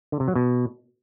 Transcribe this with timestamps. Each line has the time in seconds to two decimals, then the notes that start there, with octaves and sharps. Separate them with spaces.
0.12 D3
0.20 C3
0.28 F#3
0.35 B2